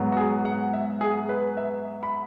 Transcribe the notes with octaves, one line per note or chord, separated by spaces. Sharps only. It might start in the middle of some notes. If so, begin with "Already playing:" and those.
Already playing: G#2 F#3 B3
F#4
G#4
F#5
E5
G#4
B4
E5
B5